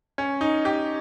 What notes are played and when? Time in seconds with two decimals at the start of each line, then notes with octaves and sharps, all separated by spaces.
0.18 C#4
0.41 D#4
0.65 G4